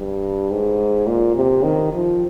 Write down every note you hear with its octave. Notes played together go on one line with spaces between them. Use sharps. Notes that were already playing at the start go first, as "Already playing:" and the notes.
Already playing: G2
G#2
A#2
C3
D#3
F3